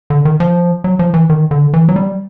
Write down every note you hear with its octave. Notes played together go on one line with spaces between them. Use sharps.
D3
D#3
F3
F#3
F3
E3
D#3
D3
E3
F#3
G3